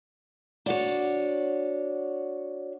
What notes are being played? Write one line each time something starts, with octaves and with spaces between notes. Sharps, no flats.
D4 F#4 C#5